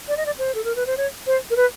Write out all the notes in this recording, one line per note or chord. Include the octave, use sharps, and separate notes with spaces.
D5
D#5
D5
C5
A4
A#4
B4
C5
C#5
C5
A#4
B4